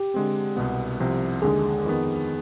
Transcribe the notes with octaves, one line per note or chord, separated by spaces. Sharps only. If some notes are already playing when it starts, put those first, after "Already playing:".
Already playing: G4
D3 G#3 C4
C2 B2 B3
C2 C3 F3 C4
D#2 D3 G#3 G#4
F2 D#3 B3